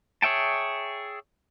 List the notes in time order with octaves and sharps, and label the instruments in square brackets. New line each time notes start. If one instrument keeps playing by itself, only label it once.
[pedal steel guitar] G#4 C#5 E5 G5 A5